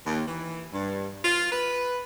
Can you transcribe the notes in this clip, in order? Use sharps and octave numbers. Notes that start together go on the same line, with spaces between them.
D#2
E3
G2
F4
B4